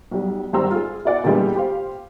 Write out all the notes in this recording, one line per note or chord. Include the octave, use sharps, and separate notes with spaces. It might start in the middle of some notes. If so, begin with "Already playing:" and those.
B1 G3
G#1 G3 C5 A#5 E6
F4 G#4
E4 F#4 D5 F#5 G#5
A#2 D3 E3 G3 G#3 B3
G4 C5 F5